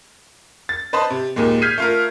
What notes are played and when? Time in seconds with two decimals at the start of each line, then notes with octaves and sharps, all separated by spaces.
0.69 A6
0.93 B4 C5 D#5 A5 B5
1.10 C3
1.36 D#2 A#2 G#3
1.62 F6 G6 G#6 B6 C7 D#7
1.78 A3 F4 A#4